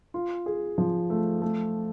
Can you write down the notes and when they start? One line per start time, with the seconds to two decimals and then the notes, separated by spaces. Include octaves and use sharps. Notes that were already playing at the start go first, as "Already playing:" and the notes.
0.14 F4
0.46 G#4
0.78 F3
1.10 A3
1.42 A3